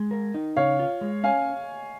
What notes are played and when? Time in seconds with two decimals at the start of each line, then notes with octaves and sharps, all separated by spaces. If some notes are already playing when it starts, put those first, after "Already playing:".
Already playing: G#3
0.11 A#4
0.34 D#4
0.56 C#3 C#5 F5
0.79 F4
1.01 G#3
1.24 C#4 F5 G#5